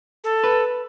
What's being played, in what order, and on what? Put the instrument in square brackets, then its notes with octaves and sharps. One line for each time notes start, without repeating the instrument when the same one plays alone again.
[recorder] A4
[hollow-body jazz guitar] B4